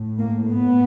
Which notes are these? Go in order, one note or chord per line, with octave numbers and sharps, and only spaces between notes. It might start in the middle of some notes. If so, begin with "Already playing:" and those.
Already playing: A2
A#3
B3